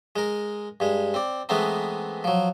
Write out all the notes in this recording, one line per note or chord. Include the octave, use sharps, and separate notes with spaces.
G#3 A#4
G2 G#3
C4 D5
E3 G#3 A3 B3 C4 D#4
F3 F#3